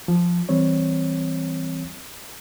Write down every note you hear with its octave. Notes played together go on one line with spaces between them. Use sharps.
F3
E3 G3 C4 C#5